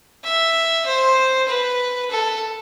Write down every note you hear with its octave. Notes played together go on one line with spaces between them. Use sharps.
E5
C5
B4
A4